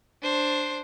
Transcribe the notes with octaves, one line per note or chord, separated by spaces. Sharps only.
D4 C5